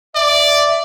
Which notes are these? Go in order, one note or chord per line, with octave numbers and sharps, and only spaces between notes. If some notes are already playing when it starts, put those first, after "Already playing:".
D5 E5